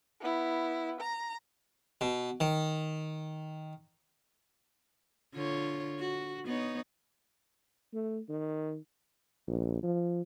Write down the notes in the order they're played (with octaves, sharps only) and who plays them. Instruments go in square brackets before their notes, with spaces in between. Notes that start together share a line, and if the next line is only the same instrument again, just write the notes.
[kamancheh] B3 E4
A#5
[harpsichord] B2
D#3
[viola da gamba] D3 F4 C#5
F#4
B3 D#4 C#5
[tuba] A3
D#3
[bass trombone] A#1
F3